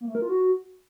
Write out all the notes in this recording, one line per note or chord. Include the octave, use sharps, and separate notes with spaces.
A#3
A3
A#4
F4
F#4